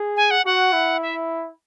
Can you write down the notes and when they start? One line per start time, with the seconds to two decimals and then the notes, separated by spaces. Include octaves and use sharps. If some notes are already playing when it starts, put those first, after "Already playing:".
Already playing: G#4
0.16 G#5
0.31 F#5
0.45 F#4 F#5
0.73 E4
1.02 E5